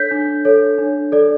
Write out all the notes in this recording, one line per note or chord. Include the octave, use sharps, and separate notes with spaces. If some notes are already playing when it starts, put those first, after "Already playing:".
Already playing: D4 A4 C#5 G6 B6
D4
A4 C#5
D4
A4 D5